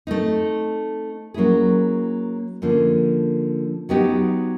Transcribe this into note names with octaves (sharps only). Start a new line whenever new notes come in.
A3 C4 D#4
F#3 A#3 C#4 E4 G#4
D3 F3 A#3 C#4 F4
F#3 B3 D#4 G4